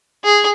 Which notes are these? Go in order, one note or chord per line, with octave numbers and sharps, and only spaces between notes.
G#4